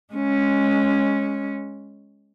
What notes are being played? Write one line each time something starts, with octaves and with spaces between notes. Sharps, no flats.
G#3 C#4